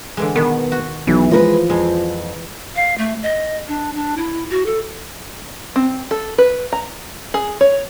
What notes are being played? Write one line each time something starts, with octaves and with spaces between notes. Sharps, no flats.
D3 E3 G#3
B2 D#3 B3
F#4
B1 E3
F3 G#3 A#4 B4
F2 G#3
F5
A3
D#5
D4
D4
E4
F#4
A4
C4
A4
B4
A#5
G#4
C#5